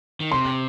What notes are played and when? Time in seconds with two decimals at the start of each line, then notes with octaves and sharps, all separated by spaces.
0.20 D#3
0.32 C3 C6